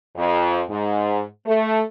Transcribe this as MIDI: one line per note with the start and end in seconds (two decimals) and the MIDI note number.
0.17 0.61 41
0.70 1.22 44
1.47 1.81 57